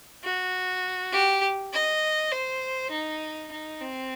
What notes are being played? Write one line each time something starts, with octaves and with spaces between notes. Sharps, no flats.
F#4
G4
D#5
C5
D#4
D#4
C4